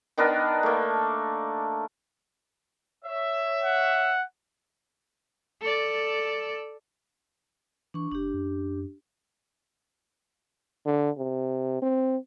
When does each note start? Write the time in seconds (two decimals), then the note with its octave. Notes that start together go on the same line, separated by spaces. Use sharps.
0.18 D#3 B3 D4 A#4
0.63 A3 A#3
3.05 C#5 E5
3.63 F#5
5.61 A4 D5
7.94 E3 D4 C#6
8.11 F#1 D4 G4
8.34 F#2
10.86 D3
11.18 C3
11.82 C4